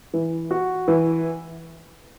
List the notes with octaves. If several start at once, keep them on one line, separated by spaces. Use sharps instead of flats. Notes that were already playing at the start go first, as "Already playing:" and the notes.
E3
F#4
E3